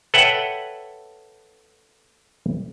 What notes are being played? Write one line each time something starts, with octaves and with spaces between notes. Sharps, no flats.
A4 B4 C#5 E5 F#5 G5